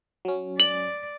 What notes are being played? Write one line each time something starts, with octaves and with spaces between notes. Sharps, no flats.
F#3 C#4
D5 F#7